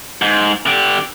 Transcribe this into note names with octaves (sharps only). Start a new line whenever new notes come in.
G#2
D3 G4